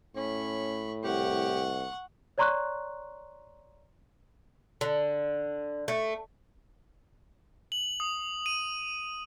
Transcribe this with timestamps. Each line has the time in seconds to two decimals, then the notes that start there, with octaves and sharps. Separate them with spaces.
0.16 A2 C#4 B5 C#6
1.04 C2 G4 F#5 C#6
2.38 C#5 D5 A#5 C6 C#6 F#6
4.81 D3
5.88 A3
7.72 F#7
8.00 D#6
8.46 D#7